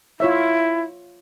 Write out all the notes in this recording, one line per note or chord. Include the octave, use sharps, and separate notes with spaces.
E4 F4 C#5 E5